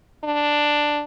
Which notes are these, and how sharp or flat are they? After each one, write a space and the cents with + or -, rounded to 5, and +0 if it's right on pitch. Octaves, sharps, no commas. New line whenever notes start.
D4 +5